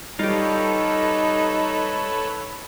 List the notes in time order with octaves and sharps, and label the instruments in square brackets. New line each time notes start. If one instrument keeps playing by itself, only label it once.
[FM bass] G3 [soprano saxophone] D#4 [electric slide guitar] F4 G4 [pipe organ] A4 B4 C#5